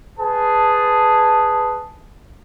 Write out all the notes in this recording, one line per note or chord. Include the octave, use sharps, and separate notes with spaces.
G#4 B4 A5